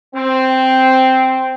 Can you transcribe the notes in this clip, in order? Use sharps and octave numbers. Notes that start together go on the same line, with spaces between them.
C4